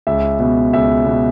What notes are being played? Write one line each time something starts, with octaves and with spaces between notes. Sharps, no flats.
C#2 E5
B2
C#2 E5
B2